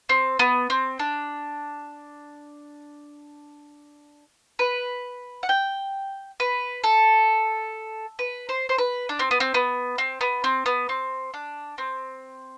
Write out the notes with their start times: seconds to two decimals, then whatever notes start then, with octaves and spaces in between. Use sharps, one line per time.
0.09 C4
0.39 B3
0.70 C4
0.99 D4
4.59 B4
5.43 F#5
5.49 G5
6.40 B4
6.84 A4
8.19 B4
8.49 C5
8.69 C5
8.78 B4
9.09 D4
9.19 C4
9.31 B3
9.40 C4
9.54 B3
9.98 C4
10.21 B3
10.44 C4
10.66 B3
10.89 C4
11.34 D4
11.78 C4